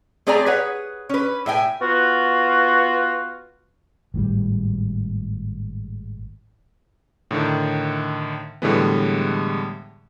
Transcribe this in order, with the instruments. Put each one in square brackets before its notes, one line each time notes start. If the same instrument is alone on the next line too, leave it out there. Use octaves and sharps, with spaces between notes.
[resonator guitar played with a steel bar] A3 C4 G#4 D5 G#5 A#5
G#4 B4 C#5 F#5
C#4 B4
A2 E5 G5 G#5
[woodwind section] B3 F4 F#4
[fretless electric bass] G#1 A2 D#3 G3
[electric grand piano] A2 D3 D#3
A2 D3 E3 G3 G#3 B3